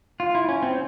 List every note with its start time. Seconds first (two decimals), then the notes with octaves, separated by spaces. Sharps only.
0.20 F4
0.35 E4
0.49 C#4
0.62 C4